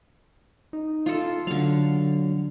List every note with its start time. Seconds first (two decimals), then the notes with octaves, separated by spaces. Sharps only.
0.73 D#4
1.06 F4 A4
1.47 D3 F#3 F5